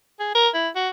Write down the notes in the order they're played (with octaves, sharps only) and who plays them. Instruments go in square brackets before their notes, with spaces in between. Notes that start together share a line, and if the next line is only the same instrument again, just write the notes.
[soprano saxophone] G#4
A#4
E4
F#4